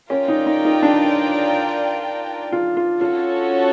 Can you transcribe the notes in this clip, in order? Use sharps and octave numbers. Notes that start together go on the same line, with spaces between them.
C#4 F4 A#4 D5 G5
D#4
D#4
D#4
D4
F4
F4
C#4 F4 F#4 A4 C#5